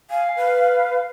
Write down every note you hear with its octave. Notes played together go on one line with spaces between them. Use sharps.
F5 G#5
B4